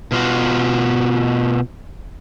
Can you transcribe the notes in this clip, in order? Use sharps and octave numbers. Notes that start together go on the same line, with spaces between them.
B2 F4 F#4